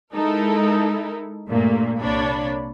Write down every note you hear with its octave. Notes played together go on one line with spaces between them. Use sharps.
G#3 D#4 E4 A4 A#4
G2 A#2 A3 A#3
C2 A#3 D4 C#5 B5